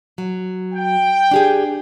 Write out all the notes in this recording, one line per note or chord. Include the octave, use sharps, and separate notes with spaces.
F#3
G5
D4 G4 G#4